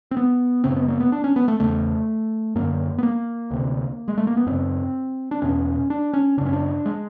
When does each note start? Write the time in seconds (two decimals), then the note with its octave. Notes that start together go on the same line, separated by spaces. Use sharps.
0.11 C4
0.17 B3
0.64 F#2 C#3 C4
0.76 B3
0.88 A#3
1.00 B3
1.12 D4
1.24 C#4
1.36 B3
1.48 A3
1.59 E2 C#3 A3
2.55 F#2 D3 A#3
2.98 B3
3.03 A#3
3.51 D2 C3
4.08 G#3
4.18 A3
4.27 A#3
4.37 B3
4.46 F#2 C#3 C4
5.31 D4
5.42 E2 B2 C#4
5.90 D4
6.13 C#4
6.37 C#3 D4
6.41 F#2 C#4
6.53 D4
6.86 G#3